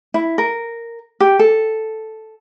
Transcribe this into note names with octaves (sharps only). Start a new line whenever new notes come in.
E4
A#4
G4
A4